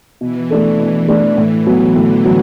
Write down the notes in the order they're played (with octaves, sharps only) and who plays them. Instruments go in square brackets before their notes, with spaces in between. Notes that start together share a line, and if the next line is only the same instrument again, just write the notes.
[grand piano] B2 [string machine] E3
[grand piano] A3 D4 A4
B2
A3 D4 A4
A2
F#3 B3
[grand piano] A2 [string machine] D3
[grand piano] F#3